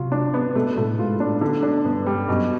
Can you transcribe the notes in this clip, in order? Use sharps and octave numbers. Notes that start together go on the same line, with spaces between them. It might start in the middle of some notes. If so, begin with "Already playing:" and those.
Already playing: C3 F#3 F4
D4
B3
B2 A3
A2 A3
G#2 F4
A2 D4
B2 D3
D4
G2 B3
G3
F#2 B2